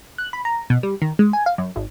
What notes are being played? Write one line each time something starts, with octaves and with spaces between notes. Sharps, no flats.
F#6
B5
A#5
B2
G3
D#3
G#3
G#5
F5
F#2
G#1